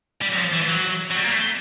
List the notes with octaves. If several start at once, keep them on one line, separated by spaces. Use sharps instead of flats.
G3
F#3
F3
E3
F#3
F#3
G3
A#3
A3